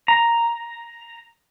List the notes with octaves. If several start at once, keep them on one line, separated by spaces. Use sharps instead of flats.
A#5